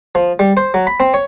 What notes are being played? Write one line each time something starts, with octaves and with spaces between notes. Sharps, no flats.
F3
G3
C5
F#3
B5
C4
C#5